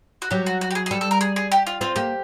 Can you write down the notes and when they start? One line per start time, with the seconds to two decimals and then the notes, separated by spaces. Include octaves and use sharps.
0.22 F#4
0.31 F#3 G4
0.46 F#4
0.61 F#4
0.71 G4
0.75 G#4
0.86 G#4
0.91 G3 A4
1.01 A4
1.11 A#4
1.21 G#4
1.36 G#4
1.52 G4
1.67 F4
1.81 C4 F4
1.96 A#3 G4